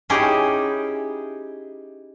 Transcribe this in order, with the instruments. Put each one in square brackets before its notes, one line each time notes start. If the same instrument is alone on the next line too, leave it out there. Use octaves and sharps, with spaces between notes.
[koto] C#4 D#4 E4 G4 G#4